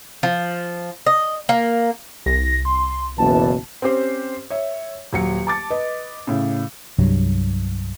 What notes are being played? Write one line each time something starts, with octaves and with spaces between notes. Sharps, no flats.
F3
D#5
A#3
C2 A#6
C6
F#1 B2 E3 A5
C4 C#4 G4 C5
C#5 E5
D#1 F#3 C#7
A5 D6 A6
B4 D#5
A2 C#3
C2 G2 C3 F#3